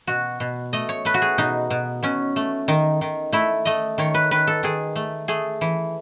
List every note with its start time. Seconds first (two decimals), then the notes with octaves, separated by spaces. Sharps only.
0.07 B2 F#4
0.40 B2
0.73 A3 D#5
0.89 C#5
1.05 A3 B4
1.14 F#4
1.22 G#4
1.38 B2 D#4
1.70 B2
2.03 B2 C#4
2.36 A3
2.68 D#3 D#4
3.01 D#3
3.33 A3 E4
3.65 A3 D#5
3.98 D#3 C#5
4.14 B4
4.31 D#3 B4
4.47 A4
4.63 D#3 G#4
4.96 A3
5.28 A3 G#4
5.61 E3